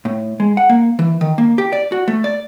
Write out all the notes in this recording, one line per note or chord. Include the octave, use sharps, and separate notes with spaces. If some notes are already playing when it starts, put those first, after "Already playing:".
A2
G#3
F#5
A#3
E3
D#3
A#3
G4
D5
F#4
A3
D5